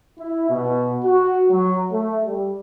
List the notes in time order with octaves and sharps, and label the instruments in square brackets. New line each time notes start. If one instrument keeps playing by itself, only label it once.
[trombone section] E4
B2
F#4
F#3
A3
G3